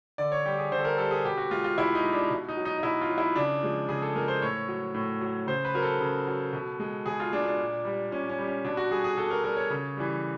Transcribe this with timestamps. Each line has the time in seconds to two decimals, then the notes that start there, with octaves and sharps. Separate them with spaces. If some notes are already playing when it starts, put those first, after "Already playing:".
0.18 D3 D5
0.32 C#5
0.45 G3 G4
0.58 G#4
0.72 D3 C5
0.79 A4
0.85 A#4
0.98 G3 A4
1.11 G#4
1.25 B2 G4
1.37 F#4
1.51 G#3 F4
1.64 F4
1.77 B2 E4
1.95 D#4
2.04 G#3
2.13 D4
2.30 B2
2.49 D#4
2.57 F#3
2.65 D#4
2.78 D#4
2.83 B2 E4
3.01 F4
3.10 F#3
3.18 E4
3.36 C#3 D4
3.63 F3 G#3
3.89 C#3 G#4
4.02 A4
4.15 F3 G#3 A#4
4.28 C5
4.42 A2 C#5
4.68 F#3
4.94 A2
5.21 F#3
5.47 C#3 C5
5.65 B4
5.74 F#3 A#4
5.83 A4
6.00 C#3
6.27 F#3
6.53 B2
6.80 G#3
7.06 B2 G#4
7.20 F4
7.33 G#3 D4
7.46 D4
7.59 A#2
7.85 G3
8.11 A#2 C#4
8.29 C#4
8.39 G3
8.47 C#4
8.65 B2 D4
8.77 F#4
8.91 G3 G#4
9.04 G#4
9.17 B2 A4
9.30 A#4
9.44 G3 A#4
9.57 C#5
9.70 C#3
9.97 E3 G3